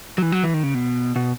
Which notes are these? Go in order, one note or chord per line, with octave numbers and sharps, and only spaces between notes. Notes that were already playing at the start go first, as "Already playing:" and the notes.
F#3
E3
F#3
E3
D#3
C#3
B2
B2